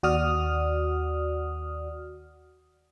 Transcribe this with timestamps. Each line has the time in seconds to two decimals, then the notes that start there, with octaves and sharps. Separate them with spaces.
0.03 D#2 F#4 D5 D#6 F6